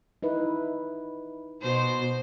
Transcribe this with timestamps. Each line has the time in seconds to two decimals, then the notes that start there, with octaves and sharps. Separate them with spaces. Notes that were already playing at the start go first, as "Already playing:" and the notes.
0.23 D#4 E4 B4
1.62 B2 C5